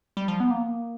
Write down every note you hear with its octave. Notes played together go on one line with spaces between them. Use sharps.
G3
F3
B3
A#3